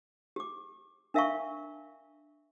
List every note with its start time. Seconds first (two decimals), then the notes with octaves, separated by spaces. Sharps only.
0.36 G4 D6
1.14 D4 A#4 E5 F5 A5 C#6